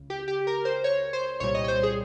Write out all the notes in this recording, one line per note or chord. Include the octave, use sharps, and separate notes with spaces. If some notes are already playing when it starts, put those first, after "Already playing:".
Already playing: C#2 C#3
G4
G4
A#4
C5
C#5
C5
C2 A#2 G3 C#5
D#5
C#5
C5
G#4